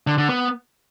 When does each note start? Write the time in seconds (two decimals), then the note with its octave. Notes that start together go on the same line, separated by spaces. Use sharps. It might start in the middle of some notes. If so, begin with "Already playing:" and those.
0.07 D3
0.18 D3
0.29 B3